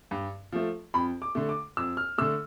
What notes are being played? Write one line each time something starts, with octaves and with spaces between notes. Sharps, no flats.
G2
F3 A3
F2 B5
D6
D3 A3
D6
F2 E6
F6
D3 A3 E6